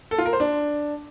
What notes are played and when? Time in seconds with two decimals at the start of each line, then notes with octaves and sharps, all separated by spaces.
0.11 A4
0.18 F4
0.26 A#4
0.33 C5
0.40 D4